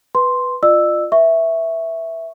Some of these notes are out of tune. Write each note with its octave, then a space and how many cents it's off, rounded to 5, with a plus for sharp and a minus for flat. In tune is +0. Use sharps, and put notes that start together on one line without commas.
B4 +0 C6 +0
F4 +0 D5 +45 E6 +0
B4 -25 E5 +0 C#6 +0